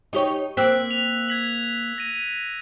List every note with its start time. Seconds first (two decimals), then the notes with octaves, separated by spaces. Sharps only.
0.13 D#4 G4 C#5
0.57 A#3 C4 E6 F#6 B6
0.91 F7
1.28 G#6 B6 F#7
1.98 A#6 D#7